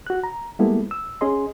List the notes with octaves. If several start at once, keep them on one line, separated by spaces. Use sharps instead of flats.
F#4 F#6
A#5
G3 G#3 A#3 B3 E4 A4
E6
C#4 G#4 D#5 C6